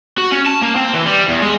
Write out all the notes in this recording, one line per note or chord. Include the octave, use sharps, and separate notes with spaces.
F#4
C#4
A5
A#3
C4
E3
G3
E2
G#3